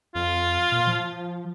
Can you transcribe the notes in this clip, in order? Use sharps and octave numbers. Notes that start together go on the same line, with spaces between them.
F2 F4
A#2
F3